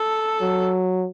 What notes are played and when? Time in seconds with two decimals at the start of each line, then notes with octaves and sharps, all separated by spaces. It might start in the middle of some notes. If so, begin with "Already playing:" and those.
Already playing: A4
0.41 F#3